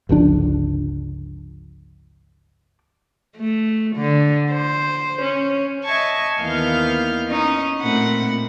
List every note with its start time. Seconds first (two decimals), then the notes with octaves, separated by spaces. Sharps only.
0.09 G1 C#2 F3 D4
3.38 A3
3.96 D3
4.53 C5
5.22 C#4
5.84 D#5 E5 G#5 A5 C#6
6.39 D#2 E3 B3 F5 F6 G6
7.27 C#4 D#4
7.80 A#2 A3 C4 F#5 B5